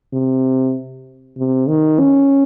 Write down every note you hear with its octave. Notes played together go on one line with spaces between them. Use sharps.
C3
C3
D#3
C#4